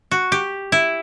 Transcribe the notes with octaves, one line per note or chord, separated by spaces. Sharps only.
F#4
G4
E4